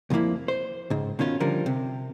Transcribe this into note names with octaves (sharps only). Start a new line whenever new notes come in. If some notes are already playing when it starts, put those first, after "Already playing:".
C2 F2 F3 A#3 E4
C5
C#2 G#2
B2 D#3 C#4 F4
D3 F3 G3 A#4
C3